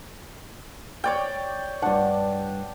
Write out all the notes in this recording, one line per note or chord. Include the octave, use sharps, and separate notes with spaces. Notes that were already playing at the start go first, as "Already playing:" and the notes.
C#5 D5 G5
G2 D4 F#5